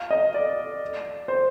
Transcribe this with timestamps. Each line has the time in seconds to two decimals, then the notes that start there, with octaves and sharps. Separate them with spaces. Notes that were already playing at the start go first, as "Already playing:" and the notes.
Already playing: F5
0.11 D#5
0.34 D5
1.28 C5